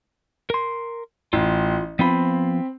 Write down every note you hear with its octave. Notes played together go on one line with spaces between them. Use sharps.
A#4 C6
A1 F4
F3 B3 C4 F4 B5